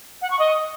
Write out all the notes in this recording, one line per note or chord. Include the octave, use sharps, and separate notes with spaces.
F#5
C#6
D#5